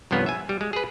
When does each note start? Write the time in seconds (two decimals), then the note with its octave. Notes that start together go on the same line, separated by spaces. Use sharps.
0.11 C2 G2 F3 B3 C#5
0.26 E5 G#5
0.49 G3
0.61 G#3
0.73 G#4 B4